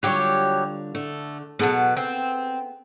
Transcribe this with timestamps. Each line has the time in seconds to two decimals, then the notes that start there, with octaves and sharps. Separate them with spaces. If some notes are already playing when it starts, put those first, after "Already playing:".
0.03 D3 F#3 G3 F4 G4 C#5
0.95 D3 A3
1.59 B2 F#3 B3 G#4 A4
1.97 C4